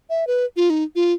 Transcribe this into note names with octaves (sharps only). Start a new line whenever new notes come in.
E5
B4
F4
D#4
F4